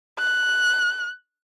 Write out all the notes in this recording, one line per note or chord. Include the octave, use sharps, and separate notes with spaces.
F#6